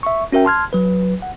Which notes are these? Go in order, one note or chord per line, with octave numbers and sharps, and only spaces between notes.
E5 C#6
C#4 F#4 A#4 E5 G5
A5 C6 F6 G#6
F#3 B4
F#5